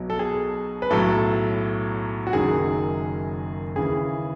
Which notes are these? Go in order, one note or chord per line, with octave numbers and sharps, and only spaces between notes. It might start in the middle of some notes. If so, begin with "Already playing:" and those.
Already playing: B1 B2 F#3
A4
G#4
B4
B1 A2 F#3 A4
F#4
F#1 F#2 D#3 F#3 G#4
D#2 C#3 E3 G#4